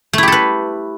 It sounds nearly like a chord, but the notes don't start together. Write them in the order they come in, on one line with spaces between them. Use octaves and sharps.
A3 E4 G4 A4 B4